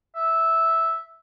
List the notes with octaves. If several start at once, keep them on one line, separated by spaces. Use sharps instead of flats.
E5